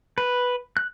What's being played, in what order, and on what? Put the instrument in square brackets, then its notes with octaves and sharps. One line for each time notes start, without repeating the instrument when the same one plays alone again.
[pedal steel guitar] B4
F#6